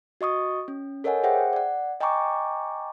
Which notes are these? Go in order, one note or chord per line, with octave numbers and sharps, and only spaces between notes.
F#4 D#5 C#6 D#6
C#4
A4 A#4 C#5 D#5 F#5 G#5
G#4 C5 E5 F#5 G5
D5 F#5
D#5 G5 G#5 A#5 C#6 D6